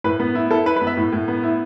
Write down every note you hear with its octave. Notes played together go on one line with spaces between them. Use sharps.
A2 B4
B3
E4
E4 A4
E4 B4
B4
B3
E5
A2
A2
B3
E4